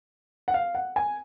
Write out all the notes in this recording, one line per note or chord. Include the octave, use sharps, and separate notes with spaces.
F#5
F5
F#5
G#5